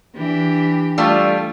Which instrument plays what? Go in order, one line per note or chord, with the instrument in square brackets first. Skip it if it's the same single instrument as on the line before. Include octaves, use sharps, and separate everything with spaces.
[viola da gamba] E3 D4 G4
[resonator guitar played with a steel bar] G3 A3 F4